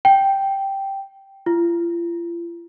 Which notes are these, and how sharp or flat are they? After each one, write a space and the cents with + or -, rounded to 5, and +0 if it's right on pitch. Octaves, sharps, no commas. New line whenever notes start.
G5 -5
F4 -40